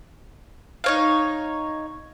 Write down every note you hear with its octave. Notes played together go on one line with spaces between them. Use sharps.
D#4 C#5 F5